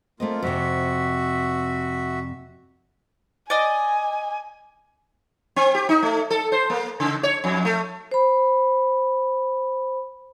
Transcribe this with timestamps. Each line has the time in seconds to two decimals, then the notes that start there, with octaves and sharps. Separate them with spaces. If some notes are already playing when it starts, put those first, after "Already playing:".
0.20 A3 A#3 C4 F4 D#5
0.42 F2 C3 F#4 E5
3.50 D5 D#5 G#5
5.56 C4
5.75 G4
5.89 D#4
6.03 A3
6.30 A4
6.52 C5
6.70 A#3
7.00 C#3
7.23 C#5
7.44 F2
7.65 A3
8.12 C5 B5